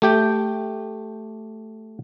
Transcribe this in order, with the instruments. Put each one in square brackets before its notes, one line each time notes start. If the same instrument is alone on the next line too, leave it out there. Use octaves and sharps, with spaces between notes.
[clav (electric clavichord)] A3 G4 G5